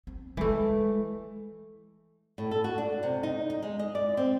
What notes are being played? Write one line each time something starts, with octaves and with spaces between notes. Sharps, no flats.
C4
E3 G#3 A3 E4
A2
A4
F#4
D4
C3
D#4
D#4
G#3
D#5
D5
C4